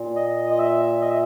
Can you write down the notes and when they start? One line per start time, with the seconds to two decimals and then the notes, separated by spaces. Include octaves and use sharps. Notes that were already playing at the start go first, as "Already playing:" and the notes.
Already playing: A#2
0.16 D#5
0.51 D#5
0.58 E5
1.01 D#5
1.10 E5